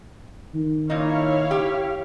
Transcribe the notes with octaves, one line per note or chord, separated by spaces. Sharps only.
D#3
A#2 D#4 E4 C#5 F5
G4